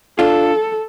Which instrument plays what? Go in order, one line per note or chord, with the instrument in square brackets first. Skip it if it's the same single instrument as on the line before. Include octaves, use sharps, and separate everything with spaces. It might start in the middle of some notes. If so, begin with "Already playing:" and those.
[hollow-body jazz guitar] D4 F4 [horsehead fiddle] A4